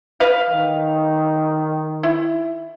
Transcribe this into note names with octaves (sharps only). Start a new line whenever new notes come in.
B4 F5
D#3
E4